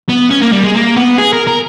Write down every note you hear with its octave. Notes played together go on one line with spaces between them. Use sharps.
B3
C#4
A#3
G3
G#3
A#3
B3
G#4
A#4
A#4